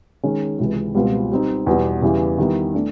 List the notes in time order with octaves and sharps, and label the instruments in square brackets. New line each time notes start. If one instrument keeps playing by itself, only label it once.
[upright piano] D#3 G#3 C#4
C#2 C3 E3 G#3
C#2 B2 G3 C4 F4
G3 C4 D#4
E2 B2 G3
E2 C#3 E3 G3
D#3 G3 B3 E4
A3 D4